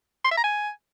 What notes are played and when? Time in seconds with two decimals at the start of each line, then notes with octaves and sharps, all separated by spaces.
0.24 C6
0.31 E5
0.37 A#5
0.44 G#5